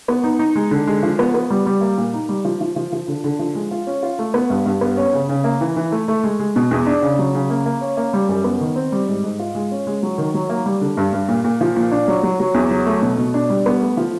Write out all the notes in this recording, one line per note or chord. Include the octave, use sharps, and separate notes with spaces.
B3
D#4
D#4
G#3
D3
G#3
F3
B3
B3
G3
G3
A#3
A#2
D#4
G3
F3
F3
F3
F3
D3
D3
F3
G#3
F4
C#4
F4
A3
B3
G2
G2
B3
C#4
C#3
C#3
A#3
E3
E3
A3
A3
G#3
G#3
B2
E2
D4
C#3
F#3
C#3
A#3
A#3
C#4
A#3
G3
F#2
B3
D#3
C4
G3
G#2
G#2
F4
G#3
C#4
G#3
F#3
D#3
F#3
A#3
G3
D3
G2
G2
A#2
A#2
F3
A#2
D4
F#3
F#3
F#3
E2
F#3
A3
B2
B2
D4
G3
B3
A3
F3